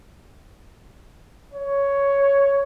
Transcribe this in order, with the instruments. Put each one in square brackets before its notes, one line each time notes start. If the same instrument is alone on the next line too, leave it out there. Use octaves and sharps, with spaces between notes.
[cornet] C#5